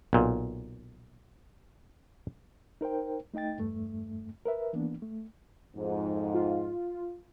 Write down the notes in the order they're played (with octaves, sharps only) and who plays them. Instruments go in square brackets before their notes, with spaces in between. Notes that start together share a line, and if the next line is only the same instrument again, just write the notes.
[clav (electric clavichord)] B1 A#2
[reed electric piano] D#4 A#4 C5 G5
A3 D#4 D#5 G5 A6
E2 G2 A3
A#4 B4 E5
E3 A#3 B3 D4
A3
[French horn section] F2 G#2
[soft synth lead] F4